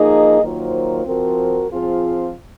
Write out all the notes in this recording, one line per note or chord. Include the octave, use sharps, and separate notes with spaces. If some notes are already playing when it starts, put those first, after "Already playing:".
Already playing: F3 A#3 D#4 G#4 D#5
D#3 F#3 A#3 F4 C5
F3 C4 F#4 A#4
F3 C4 F4 G#4